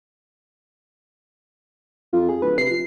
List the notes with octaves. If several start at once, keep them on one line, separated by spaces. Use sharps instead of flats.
F2 F4
G#4
D1 B4
C3 C7
F3